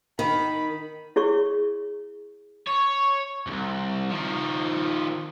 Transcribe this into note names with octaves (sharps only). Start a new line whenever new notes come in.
D#3 B5
E4 G#4 C#5 C#6
C#5
C2 F2
D#3 F3